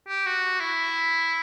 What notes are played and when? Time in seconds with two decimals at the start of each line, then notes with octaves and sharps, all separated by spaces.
0.08 G4
0.26 F#4
0.60 E4